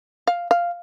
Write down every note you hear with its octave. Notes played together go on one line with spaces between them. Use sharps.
F5
F5